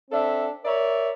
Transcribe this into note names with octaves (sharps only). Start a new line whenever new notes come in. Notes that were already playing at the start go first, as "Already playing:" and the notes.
C4 D4 A4 E5
A#4 C#5 D5 E5